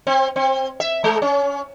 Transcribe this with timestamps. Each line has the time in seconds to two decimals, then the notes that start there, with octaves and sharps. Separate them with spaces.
0.07 C4
0.36 C4
0.80 E5
1.04 G#3
1.22 C#4